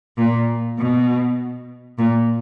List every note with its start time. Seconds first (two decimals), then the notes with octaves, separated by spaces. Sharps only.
0.18 A#2
0.79 B2
1.99 A#2